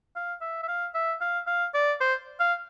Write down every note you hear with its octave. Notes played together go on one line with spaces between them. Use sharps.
F5
E5
E5
F5
E5
F5
F5
D5
C5
F5